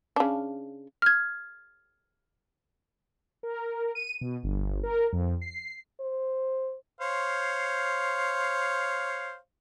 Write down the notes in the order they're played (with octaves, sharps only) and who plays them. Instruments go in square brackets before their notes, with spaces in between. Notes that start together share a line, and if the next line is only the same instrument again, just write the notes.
[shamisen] C#3 D4
[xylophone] F6 G#6
[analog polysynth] A#4
D#7
B2
G1
A#4
F2
C7
[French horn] C5
[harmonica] C5 C#5 F5